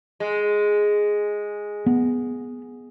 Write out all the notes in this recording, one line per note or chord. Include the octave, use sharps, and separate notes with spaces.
G#3
B3